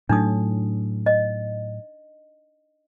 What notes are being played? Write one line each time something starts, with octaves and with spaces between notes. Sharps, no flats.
A2 F#3 D4 D#4 D#6
D#5